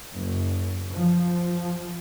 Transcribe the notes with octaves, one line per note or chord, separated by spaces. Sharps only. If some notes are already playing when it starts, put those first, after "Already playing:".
F#1
F3